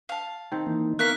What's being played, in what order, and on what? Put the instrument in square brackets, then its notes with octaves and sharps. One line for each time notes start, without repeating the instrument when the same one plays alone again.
[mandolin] F5 A5
[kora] D#3 C4
[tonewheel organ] E3 A#3 D#4
[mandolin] A#3 A#4 E5 [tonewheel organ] B3 F5 C#6 [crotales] F#6 B6